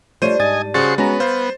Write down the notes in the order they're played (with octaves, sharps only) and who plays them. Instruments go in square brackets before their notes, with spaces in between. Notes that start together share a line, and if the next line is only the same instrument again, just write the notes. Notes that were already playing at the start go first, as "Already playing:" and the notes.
[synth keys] F3 A3 C#5 [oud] G3 D4 [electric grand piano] C5 D#7
[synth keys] G#2 [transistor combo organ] D#5 G#5 [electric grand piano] A6
[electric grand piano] C#3 G#4 A6 [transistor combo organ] F#4 C5 C#6
[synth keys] G#3 C#4 A#5 [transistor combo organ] B3 [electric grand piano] F#4
[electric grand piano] C5 [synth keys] F5